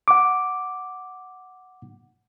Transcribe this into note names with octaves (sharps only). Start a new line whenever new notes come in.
F#5 D6